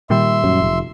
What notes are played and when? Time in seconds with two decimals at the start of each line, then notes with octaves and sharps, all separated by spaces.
0.10 A#2 D#3 G3 E5 C6
0.44 F#2
0.62 F1